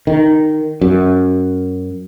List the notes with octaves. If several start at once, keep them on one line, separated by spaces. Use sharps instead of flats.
D#3
F#2